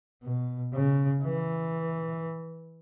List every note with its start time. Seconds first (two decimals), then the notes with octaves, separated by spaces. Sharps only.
0.23 B2
0.73 C#3
1.23 E3